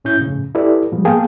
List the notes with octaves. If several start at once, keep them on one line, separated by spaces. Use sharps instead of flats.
A2 C#4 E4 G6
F2 A2 C#3
E4 G4 A4 B4 D5
A2 F3 G3 G#3
A#3 B3 G#4 F5 G5 A5